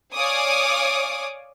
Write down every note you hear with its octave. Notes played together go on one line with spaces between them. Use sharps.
C#5 D5 F5 G#5 D6 D#6